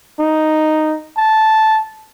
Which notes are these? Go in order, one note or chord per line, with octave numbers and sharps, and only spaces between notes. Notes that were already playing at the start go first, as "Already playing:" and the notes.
D#4
A5